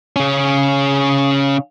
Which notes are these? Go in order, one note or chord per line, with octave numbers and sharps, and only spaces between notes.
C#3 C#4